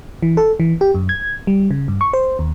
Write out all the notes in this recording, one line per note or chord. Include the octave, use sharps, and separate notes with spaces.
E3
A4
E3
G4
F#2
G#6
G3
C#3
G2
C#6
C5
D#2